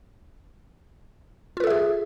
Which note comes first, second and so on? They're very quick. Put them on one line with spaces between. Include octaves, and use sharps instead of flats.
F4 B4 A4 E5 G#4